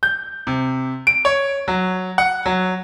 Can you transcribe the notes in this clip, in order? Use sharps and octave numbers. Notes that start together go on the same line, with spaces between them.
G6
C3
D7
C#5
F#3
F#5
F#3